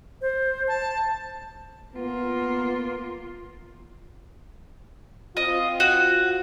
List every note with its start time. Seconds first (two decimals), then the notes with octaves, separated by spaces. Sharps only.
0.21 C5
0.68 A5
1.95 A#3 B3 F4
5.37 C4 F4 D#5
5.80 F#4